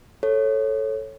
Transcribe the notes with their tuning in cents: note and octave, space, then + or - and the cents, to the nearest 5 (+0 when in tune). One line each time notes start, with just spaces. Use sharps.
A4 +0 C#5 -10